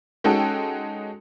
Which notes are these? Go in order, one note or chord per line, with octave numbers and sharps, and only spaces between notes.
G#3 C#4 D#4 F#4 A4 G5